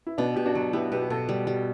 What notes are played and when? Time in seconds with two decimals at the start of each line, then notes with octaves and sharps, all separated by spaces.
0.07 E4
0.18 B2 B3 D4
0.36 B2 G4
0.45 D4 F#4
0.55 F#3
0.73 B3 E4 G4
0.92 B2 G4 B4
1.02 G4
1.10 B2 F#4 A4
1.29 G3
1.47 G3